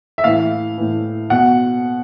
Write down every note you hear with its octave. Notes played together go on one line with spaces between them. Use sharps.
E5
A2 E3 F5
A2 E3
B2 F#5